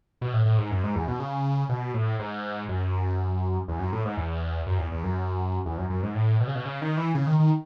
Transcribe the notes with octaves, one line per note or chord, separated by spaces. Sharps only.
B2
A2
A2
G#2
F#2
G#2
E2
B2
C#3
B2
A2
G#2
F#2
E2
F#2
A2
G#2
E2
F#2
E2
E2
F#2
E2
F#2
F#2
G#2
A2
B2
C#3
B2
C#3
D#3
E3
C#3
D#3
D#3